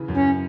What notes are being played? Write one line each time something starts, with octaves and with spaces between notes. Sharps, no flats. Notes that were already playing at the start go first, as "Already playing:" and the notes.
Already playing: C#3 E3
F#2
C#4